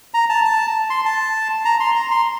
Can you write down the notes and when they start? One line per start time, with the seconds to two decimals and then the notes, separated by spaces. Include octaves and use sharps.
0.14 A#5
0.29 A5
0.45 A5
0.90 C6
1.05 A5
1.65 A#5
1.80 C6
1.96 A#5
2.11 C6